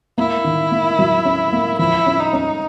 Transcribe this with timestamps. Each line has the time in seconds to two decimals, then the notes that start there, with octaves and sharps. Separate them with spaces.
0.18 A#3 E4
0.44 D#3
0.71 A#3
0.99 F#3
1.25 C#4
1.53 A#3
1.79 F3 E4
2.06 C#4
2.20 D#4
2.33 C#4